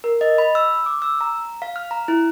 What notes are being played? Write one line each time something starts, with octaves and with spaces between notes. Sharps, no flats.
A#4
D#5
B5
E6
D6
E6
A#5
F5
F6
A#5
E4